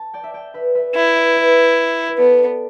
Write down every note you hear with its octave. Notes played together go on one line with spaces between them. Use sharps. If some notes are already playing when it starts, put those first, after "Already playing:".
Already playing: A5
D5 G5
E5
D5 G5
B4 E5
B4 E5
E4 D5 G5
B4 E5
B4 E5
B4
B3 A4 D5
A4